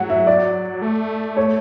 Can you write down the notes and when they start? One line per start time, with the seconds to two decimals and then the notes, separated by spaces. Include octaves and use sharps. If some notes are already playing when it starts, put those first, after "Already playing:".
Already playing: F#3 F#5
0.10 E5
0.27 D5
0.82 A3
1.37 C#5